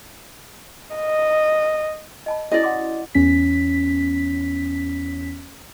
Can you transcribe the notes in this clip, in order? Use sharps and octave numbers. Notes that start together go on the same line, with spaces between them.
D#5
D#5 A5 B5
C#4 E4 F#4 D5 D#5
F#5 C6 D6
E2 C#4 B6